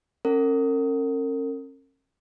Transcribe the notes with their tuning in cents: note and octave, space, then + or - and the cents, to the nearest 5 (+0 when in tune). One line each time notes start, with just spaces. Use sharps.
C#4 -35 A#4 -40